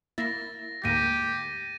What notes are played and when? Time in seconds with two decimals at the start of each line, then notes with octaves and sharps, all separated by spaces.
0.18 A#3 E4 A6 A#6
0.84 D2 G#2 A#3 G4 A#6 D#7